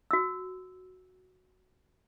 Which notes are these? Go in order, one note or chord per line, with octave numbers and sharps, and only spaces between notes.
F#4 E6